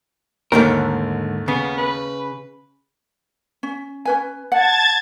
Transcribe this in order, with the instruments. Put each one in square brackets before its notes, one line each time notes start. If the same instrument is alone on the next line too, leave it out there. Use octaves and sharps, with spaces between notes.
[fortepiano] D#2 A3 [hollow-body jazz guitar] G#2 D3 A#4
[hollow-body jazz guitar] C#3 [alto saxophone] B3
[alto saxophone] B4
[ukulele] C#4
C#4 B4 G#5
[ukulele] F#5 [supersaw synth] A5 G#6 A6